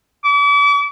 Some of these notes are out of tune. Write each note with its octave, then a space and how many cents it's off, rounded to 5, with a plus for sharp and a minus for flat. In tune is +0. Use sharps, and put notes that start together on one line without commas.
D6 -40